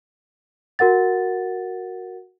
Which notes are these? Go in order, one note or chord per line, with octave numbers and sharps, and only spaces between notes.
F#4 A#4 F#5 A6